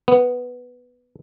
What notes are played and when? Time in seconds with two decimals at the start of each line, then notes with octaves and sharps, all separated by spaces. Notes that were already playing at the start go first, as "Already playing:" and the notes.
0.08 B3